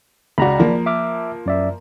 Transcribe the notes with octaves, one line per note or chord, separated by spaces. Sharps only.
C#2 F#4 D5 A#5 B5
F3 A#3
E5 D6 F6
F#2 D5 E5